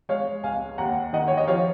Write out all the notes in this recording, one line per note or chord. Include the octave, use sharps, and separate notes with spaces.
G#3 C#5 F5
C#2 F5 G#5
D#2 F#5 A#5
D#3 D#5 F#5
C#5
D#5
F3 C#5 F5